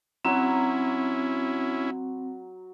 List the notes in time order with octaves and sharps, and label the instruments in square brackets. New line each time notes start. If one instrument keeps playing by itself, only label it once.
[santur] F#3 F#4 B5 [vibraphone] C4 [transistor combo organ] C#4 E4